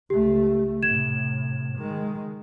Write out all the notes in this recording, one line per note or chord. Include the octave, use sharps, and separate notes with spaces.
C#2 A3 G4
A2 C3 G#6 E7
D#3 G#3